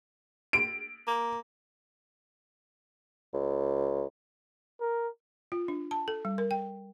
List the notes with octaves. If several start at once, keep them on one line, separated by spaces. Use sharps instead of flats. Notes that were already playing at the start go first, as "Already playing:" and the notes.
D7
A#3
C#2
A#4
F4
D4
A5
A4
G3
A#4
G5